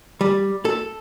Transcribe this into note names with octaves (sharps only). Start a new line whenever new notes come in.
G3
A4